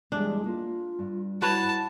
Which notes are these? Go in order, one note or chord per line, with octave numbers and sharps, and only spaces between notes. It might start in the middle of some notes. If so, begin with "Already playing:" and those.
E2 G3 G#3 D4
A#3 F4
G2
E4 F#4 B4 C#5 A5